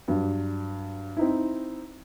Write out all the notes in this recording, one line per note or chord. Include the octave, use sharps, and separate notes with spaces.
G2 F#3
C4 D#4 E4